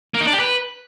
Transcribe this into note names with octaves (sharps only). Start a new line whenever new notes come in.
A#3
D#4
D4
G4
B4